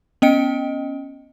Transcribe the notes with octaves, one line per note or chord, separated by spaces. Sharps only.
B3 C#4 D#5 G5 C#7 D7